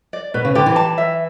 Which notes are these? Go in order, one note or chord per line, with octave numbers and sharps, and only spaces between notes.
D5
B2 B4
C#3
D3 G4
E3
A5
E5